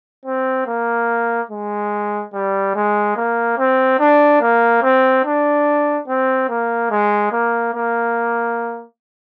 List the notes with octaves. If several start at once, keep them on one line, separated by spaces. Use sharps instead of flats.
C4
A#3
G#3
G3
G#3
A#3
C4
D4
A#3
C4
D4
C4
A#3
G#3
A#3
A#3